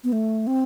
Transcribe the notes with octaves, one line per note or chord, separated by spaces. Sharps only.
B3
A3
C4